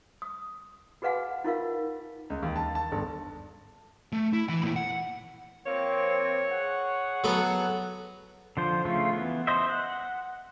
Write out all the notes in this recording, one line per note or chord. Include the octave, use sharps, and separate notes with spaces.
D#6
F#4 G#4 B4 F5 F#5 G#5
D#4 F4 A#4 F5
C#2
D#2
A5
A5
G1
A3
E4
E3 B5
A#2 E4
F#5
F3 A#3 C4 C#5
G#4 F#5
F#3 B3 A4
D3 F3 C5
C#3 A3 F4
E3 B3
C5 D#5 E5
F#5